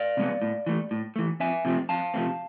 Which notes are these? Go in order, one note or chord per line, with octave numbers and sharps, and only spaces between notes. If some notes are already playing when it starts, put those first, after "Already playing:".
Already playing: D5 F5
C3 G#3 B3
A2
E3 A3
A2
E3 A3
F2 E5 G#5
C3 F3 A3 C4
F2 F5 A5
C3 F3 A3 C4